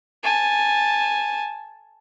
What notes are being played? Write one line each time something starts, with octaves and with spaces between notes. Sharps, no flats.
G#5 A5